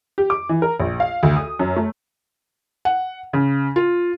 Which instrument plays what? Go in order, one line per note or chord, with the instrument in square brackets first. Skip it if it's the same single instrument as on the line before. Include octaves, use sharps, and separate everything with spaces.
[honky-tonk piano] G4
D6
E3
A#4
A#1
F5
D2
D#6
F#2
A3
[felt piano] F#5
C#3
F4